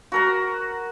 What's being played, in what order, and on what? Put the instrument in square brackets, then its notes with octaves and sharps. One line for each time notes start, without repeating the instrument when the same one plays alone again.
[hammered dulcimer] F#4 A#4 A#5